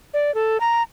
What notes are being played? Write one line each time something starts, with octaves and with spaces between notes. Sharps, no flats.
D5
A4
A#5